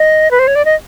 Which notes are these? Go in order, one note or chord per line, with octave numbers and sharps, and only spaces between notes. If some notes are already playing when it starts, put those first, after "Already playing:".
Already playing: D#5
B4
C5
C#5
D5
D#5